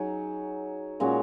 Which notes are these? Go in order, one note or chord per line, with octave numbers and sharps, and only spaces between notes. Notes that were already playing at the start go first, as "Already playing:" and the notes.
Already playing: F#3 D#4 G#4
A#2 G#3 C#4 F#4